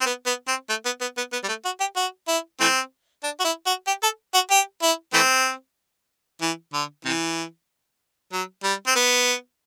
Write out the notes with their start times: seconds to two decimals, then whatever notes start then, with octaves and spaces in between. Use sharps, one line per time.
0.01 C4
0.06 B3
0.26 B3
0.48 C4
0.69 A3
0.85 B3
1.01 B3
1.17 B3
1.33 B3
1.43 G3
1.48 A3
1.65 F#4
1.80 G4
1.96 F#4
2.28 E4
2.60 E3 A3 C4
3.23 D4
3.40 F#4
3.45 E4
3.66 F#4
3.87 G4
4.03 A4
4.34 F#4
4.51 G4
4.82 E4
5.13 E3 A3 C4
6.42 E3
6.73 D3
7.05 C3 E3
8.32 F#3
8.64 G3
8.87 C4
8.95 B3